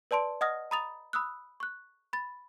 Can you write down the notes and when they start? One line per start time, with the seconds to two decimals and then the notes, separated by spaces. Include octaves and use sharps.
0.11 B4 D5 A5 C6 D7
0.41 D#5 F#5 D#6 F6 A#6
0.71 A#5 B5 D#6 A6 F7
1.13 B5 D#6 E6 F#6
1.60 C#6 F#6
2.13 B5 A6